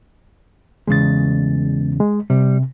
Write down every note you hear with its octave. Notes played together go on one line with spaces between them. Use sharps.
E2 C#3 G#3 A6
G#3
C3 G3